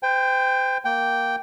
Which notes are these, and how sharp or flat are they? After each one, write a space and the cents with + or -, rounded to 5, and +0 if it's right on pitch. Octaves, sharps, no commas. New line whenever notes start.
C5 -35 G5 +15
A#3 +0 G5 -5